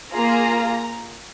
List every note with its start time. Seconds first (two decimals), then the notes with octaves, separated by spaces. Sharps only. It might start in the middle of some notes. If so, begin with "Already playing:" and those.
0.12 A#3 F4 G#4 A#5